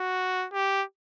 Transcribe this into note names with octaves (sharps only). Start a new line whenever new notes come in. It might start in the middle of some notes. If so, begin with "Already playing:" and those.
Already playing: F#4
G4